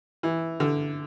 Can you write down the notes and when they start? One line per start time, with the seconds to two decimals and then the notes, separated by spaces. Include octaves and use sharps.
0.23 E3
0.60 D3